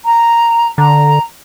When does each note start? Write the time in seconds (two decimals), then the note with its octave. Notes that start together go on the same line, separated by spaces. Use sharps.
0.05 A#5
0.78 D3 A#5